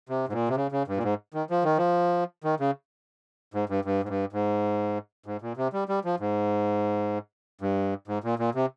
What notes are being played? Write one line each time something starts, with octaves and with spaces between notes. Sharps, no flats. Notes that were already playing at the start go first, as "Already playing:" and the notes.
C3
G#2
A#2
C3
C#3
C#3
G2
A#2
G#2
D#3
F3
D#3
F3
D#3
C#3
G#2
G2
G2
G#2
G2
G#2
G#2
A#2
C3
G3
G3
F3
G#2
G2
G#2
A#2
A#2
C3